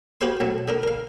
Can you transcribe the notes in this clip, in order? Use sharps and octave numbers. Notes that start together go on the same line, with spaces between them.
F#4 G4 B4 C5 F5 C6
B1 F#3 A3
D3 D4 A#4
A#4 F5